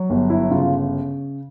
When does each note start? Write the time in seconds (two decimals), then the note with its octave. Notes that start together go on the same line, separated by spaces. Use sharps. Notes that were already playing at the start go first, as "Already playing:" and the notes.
Already playing: F#3
0.10 G1
0.30 E4
0.50 C#3 F4